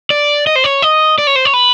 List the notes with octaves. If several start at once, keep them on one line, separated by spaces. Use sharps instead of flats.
D5
D#5
C5
C#5
D#5
D5
C#5
C5
C#5
B4